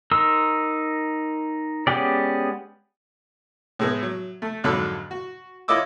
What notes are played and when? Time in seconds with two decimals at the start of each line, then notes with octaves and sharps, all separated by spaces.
0.12 D#4 A#4 C6 E6
1.87 G#3 B3 C#4 G4 D5
3.79 A2 G#3 B3
4.03 F#3
4.42 A3
4.64 F2 G#2 D3 F#3 B5 E6
5.11 F#4
5.68 E4 F4 C#5 D#5 D6 E6